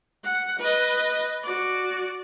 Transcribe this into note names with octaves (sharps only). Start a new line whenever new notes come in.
F#5
B4 D#5
F#4 D5